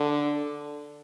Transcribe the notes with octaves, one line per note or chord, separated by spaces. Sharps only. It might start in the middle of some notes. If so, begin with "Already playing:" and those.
Already playing: D3